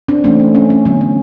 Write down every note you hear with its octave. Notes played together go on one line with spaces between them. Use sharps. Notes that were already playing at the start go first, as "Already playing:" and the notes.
C4 D4
E3 A3 C4 C#4
C#4
C#4
C#4
D3 F#3 B3 C#4
C#4